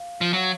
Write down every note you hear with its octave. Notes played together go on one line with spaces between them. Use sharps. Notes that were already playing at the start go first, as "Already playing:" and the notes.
Already playing: F5
F3
F#3